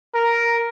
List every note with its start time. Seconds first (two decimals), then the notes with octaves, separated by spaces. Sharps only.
0.14 A#4